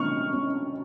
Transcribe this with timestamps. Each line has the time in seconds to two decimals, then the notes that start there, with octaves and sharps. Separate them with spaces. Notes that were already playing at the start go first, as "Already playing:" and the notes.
Already playing: A3 C#4 C#6 F6
0.33 C#4